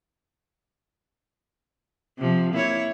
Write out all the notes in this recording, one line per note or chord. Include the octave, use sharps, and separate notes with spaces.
C3 F3
A#3 E4 C#5